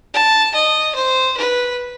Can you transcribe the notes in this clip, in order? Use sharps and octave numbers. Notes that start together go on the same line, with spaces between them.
A5
D#5
C5
B4